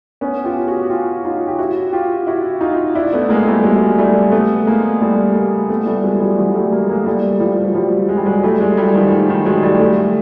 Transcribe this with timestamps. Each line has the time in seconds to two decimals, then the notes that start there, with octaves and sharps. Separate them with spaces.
0.21 B3 C#4
0.44 F4 G4
0.67 F#4 G#4
0.90 F4 G4
1.25 D#4 F4
1.47 G4
1.59 E4 F#4
1.93 F4 G4
2.27 E4 F#4
2.61 D#4 F4
2.95 D4 E4
3.13 A3 B3
3.29 G#3 A#3
3.47 G3 A3
3.63 F#3 G#3
3.99 G3 A3
4.32 A3 B3
4.66 G#3 A#3
5.01 G3 A3
5.35 G#3 A#3
5.69 A3 B3
5.86 G3 A3
6.03 F#3 G#3
6.20 F3 G3
6.38 E3 F#3
6.54 G3 A3
6.72 G#3 A#3
6.89 G#3 A#3
7.06 G3 A3
7.40 F3 G3
7.65 F#3
7.74 F3 G3
8.09 G#3
8.17 G3
8.26 F#3 G#3
8.43 G3 A3
8.60 F#3 G#3
8.77 G3 A3
8.94 D#3 F3
9.12 D#3
9.29 D#3
9.46 F#3 G#3
9.63 G3 A3
9.79 G3 A3